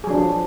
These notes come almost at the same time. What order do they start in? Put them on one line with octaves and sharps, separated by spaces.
G#4 F#3 D4 F3